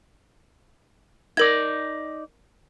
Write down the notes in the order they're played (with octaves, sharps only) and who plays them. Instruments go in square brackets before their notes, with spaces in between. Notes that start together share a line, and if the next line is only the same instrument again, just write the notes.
[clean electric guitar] D#4 D5 [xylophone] A#4 G#6